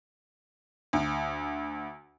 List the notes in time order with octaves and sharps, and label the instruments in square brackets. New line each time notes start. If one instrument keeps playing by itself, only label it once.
[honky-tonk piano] D2